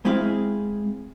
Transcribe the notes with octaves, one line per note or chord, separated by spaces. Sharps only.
G#3 C4 E4 G#4 F5